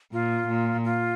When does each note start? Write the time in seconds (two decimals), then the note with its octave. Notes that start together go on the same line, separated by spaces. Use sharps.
0.12 A#2 F4
0.48 A#2
0.84 F4